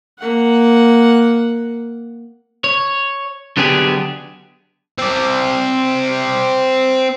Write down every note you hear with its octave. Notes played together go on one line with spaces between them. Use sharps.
A#3 F#5
C#5
D3 F#3 B3 D4 G4 G#4
C4 D5